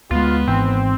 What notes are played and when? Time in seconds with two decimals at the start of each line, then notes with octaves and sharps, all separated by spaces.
0.11 D2 G#3 B3 F4
0.48 G#1 G#2 E3 C4